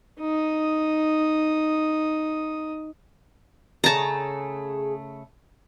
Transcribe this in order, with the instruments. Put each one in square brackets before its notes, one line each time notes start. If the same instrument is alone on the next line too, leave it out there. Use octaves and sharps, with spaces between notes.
[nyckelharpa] D#4 D#6
[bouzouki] C#3 A3 [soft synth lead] G#4 [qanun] A5 A#5